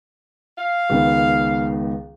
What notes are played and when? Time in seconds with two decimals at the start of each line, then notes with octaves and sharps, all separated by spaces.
0.58 F5
0.90 C#2 D#3 B3